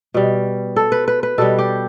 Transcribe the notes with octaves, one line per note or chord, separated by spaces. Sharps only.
B2 G3
A4
B4
B4
B4
B2 G3 A4
G4